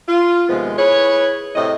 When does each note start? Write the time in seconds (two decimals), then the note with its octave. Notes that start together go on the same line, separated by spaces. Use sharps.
0.08 F4
0.49 D#2 C3 F3 G#3 B3 C5
0.78 E4 G#4 B4 C#5
1.56 A2 C3 D#5